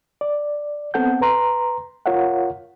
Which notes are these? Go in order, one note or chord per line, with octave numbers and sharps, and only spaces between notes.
D5
B3 C4 A4 F#5 G6
B4 A#5 C6
F4 A#4 C#5 F5 F#5